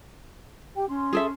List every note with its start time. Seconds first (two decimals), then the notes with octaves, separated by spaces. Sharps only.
0.75 G4 G5
0.88 C#4 C6
1.13 G#4 A4 E5